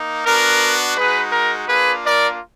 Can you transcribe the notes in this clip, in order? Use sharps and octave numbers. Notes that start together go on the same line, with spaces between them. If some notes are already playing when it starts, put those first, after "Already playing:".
Already playing: A#3 D#4
B3 D4 F#4 A#4
G#3 D#4 F#4 G#4 B4
A#4
A#3 D4 F4 G#4 B4
A#4 D5